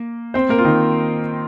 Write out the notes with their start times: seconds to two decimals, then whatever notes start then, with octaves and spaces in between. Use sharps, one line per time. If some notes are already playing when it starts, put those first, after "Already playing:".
Already playing: A#3
0.34 C4 C5
0.49 A#3 A#4
0.58 F4
0.64 D#3 D#4